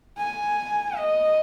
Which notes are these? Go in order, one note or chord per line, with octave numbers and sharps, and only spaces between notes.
G#5
D#5